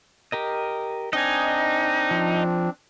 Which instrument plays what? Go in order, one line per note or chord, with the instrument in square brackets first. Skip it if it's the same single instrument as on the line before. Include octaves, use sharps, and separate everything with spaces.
[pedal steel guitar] G4 A#4 D#5
[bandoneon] C4 D4 [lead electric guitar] D#4 [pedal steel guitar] D#5 G#5
[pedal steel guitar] F3